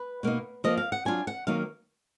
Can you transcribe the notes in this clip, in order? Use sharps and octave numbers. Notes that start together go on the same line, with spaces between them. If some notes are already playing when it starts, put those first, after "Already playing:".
Already playing: B4
B2 A#3 D#4
F3 A#3 F4 D#5
F5
F#5
F#3 D4 F4 G#5
F#5
D#3 F#3 A#3 D#4 F5